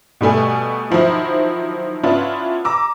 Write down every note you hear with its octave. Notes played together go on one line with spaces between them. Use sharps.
B2 G3 A3 G#5
D#3 F3 F#3 E4
B3 C#4 D4 E4 F4
A#5 D6 E6